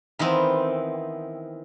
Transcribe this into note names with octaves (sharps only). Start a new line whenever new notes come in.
D#3 E3 B3 C4